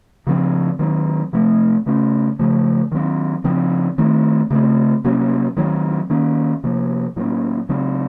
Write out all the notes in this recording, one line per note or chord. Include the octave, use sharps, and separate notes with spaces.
C#3 F3 C4
D#3 F#3 C4
C3 F3 A3 C4
C#3 A3 C#4
C#3 F3 A3
D#3 F#3 C4
C#3 F3 C4
D#3 A3 C4
C#3 A3 C4
C3 F#3 A#3 C#4
D#3 F#3 C4
D#3 A#3 C#4
C3 F3 A#3
A2 F#3 A#3 C#4
C#3 F#3 C4